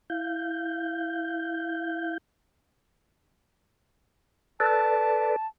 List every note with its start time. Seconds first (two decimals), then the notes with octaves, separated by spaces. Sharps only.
0.10 E4 F5 G6
4.60 A4 B4 D5 A5